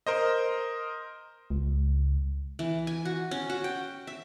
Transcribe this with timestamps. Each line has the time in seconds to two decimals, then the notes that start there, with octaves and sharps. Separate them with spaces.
0.06 A#4 C5 D#5
1.50 C#2
2.59 E3
2.87 G#5
3.05 F#4
3.31 C#4
3.50 F#4
3.64 G5
4.07 E5